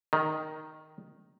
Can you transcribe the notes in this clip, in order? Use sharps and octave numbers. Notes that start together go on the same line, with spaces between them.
D#3